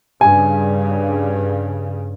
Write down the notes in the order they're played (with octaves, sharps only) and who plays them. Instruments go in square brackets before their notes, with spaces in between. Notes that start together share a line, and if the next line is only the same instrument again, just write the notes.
[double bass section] G2 C#3 [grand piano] G#5